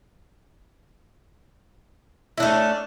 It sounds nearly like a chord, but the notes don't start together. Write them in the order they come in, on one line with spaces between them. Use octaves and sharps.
E4 D4 A3 C#4